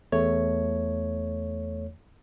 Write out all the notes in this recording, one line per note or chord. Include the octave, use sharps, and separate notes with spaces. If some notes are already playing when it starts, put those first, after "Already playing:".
E2 A3 C#5